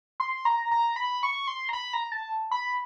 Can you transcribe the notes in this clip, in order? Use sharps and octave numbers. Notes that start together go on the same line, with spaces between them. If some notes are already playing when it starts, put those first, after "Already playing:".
C6
A#5
A#5
B5
C#6
C6
A#5
B5
A#5
A5
B5